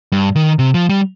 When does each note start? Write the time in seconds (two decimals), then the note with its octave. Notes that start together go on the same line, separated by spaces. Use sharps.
0.12 G2
0.36 D#3
0.59 C3
0.74 F3
0.89 G3